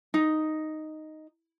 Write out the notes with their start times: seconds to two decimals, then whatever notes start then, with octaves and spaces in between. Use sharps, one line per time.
0.14 D#4